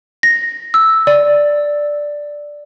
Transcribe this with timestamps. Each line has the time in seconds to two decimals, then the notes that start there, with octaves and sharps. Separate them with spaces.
0.23 A#6
0.74 E6
1.07 D5